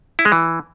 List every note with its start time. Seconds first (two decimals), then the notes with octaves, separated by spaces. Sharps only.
0.19 E4
0.25 G#3
0.32 E3